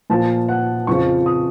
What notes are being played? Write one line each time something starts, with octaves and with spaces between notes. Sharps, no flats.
A#2 F3 A5
F#5
F2 C#3 F3 C#6
D#6